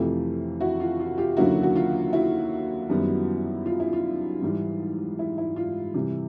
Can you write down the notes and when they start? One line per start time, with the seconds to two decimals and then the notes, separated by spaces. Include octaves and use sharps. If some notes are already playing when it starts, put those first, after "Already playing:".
Already playing: F2 C3 E3 A3 F4 G4
0.61 E4 F#4
0.80 F4
1.00 F4
1.18 F4 G4
1.37 D#2 D3 F#3 A#3 C#4 E4 F#4
1.63 F#4
1.76 F4
2.13 E4 F#4
2.90 F#2 D#3 G3 B3
3.66 F4
3.80 E4
3.93 F4
4.42 G#2 E3 G3
5.19 E4
5.38 E4
5.56 F4
5.94 C3 E3 G3